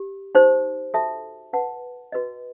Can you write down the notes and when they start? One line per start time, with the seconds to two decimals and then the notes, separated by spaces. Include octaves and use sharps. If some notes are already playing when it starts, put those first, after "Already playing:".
Already playing: G4
0.35 D#4 G4 C5
0.94 F#4 A4 E5 A5
1.53 B4 F#5 A5
2.12 F#4 B4 D#5